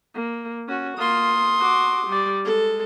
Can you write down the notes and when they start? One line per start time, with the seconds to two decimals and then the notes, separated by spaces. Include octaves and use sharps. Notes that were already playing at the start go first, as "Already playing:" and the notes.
0.15 A#3
0.68 C#4 F#4
0.98 A#3 F4 C6 D#6
1.60 F#4 D6
2.07 G3 D5
2.45 G#3 A4